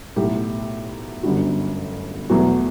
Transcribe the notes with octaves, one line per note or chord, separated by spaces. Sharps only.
B1 A2 F#3 A3 G4
G1 F#2 D3 G3 F#4
E2 B2 F#3 A3 F#4